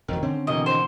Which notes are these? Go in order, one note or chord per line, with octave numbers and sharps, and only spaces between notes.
F1 G#2 D#3 F#3
D3 C4 C#4
B2 D#3 E3 D#5
C5